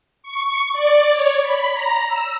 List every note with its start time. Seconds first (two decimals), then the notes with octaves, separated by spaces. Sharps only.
0.23 C#6
0.73 D5
1.11 C#5
1.43 B5
1.74 A#5
2.08 E6